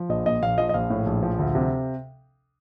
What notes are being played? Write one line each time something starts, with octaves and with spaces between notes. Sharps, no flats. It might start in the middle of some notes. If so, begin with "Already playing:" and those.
Already playing: F3
A#1 D#5
A#2 D#5
A#1 F5
F3 D#5
D#5
A#1 F5
A2
A#1
F3
D2
C3